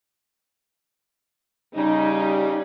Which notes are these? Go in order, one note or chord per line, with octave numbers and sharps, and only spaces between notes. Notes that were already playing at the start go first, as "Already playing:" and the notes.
C#3 G3 D#4